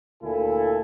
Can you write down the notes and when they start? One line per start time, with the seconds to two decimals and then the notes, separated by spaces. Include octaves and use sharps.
0.23 D2 A#2 E4 A4 G#5